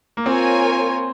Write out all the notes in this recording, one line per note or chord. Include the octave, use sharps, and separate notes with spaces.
A#3
C4 F4 A#4 C#5 G#5